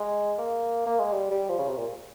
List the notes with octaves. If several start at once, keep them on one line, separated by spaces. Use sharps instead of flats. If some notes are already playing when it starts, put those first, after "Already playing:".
Already playing: G#3
A#3
A#3
G#3
G3
G3
F3
C#3
C3
A#2